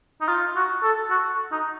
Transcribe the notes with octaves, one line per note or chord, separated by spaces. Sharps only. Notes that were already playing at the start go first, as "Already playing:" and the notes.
D#4
F4
F#4
A4
F#4
D#4